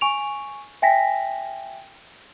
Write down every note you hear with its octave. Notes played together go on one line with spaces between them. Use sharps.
G#5 C#6 D7 F7
E5 G5 G#5 A#6 B6